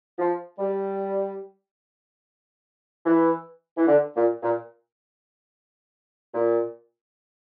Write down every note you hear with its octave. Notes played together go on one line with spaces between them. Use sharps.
F3
G3
E3
E3
D3
A#2
A#2
A#2